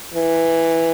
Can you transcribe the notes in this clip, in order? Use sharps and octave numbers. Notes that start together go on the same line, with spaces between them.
E3